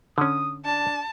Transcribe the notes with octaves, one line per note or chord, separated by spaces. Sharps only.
D3 C#4 D#6
D4 A5